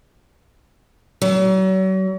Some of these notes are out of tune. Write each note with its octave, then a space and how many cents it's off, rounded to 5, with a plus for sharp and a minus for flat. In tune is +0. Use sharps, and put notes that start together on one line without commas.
F#3 +40